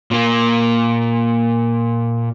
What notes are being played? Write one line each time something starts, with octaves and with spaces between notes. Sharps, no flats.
A#2 A#3